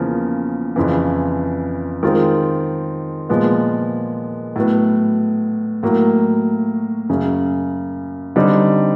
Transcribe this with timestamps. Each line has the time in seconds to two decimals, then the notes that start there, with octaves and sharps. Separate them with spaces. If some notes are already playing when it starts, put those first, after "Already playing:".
Already playing: E2 C#3 F3 A#3
0.76 F2 C#3 E3
2.03 D#3 G#3 C4 F4
3.29 A#2 F3 G#3 B3
4.56 A2 F#3 B3
5.83 A2 F#3 A#3
7.09 F#2 C#3 F#3
8.36 D3 G3 C4 D#4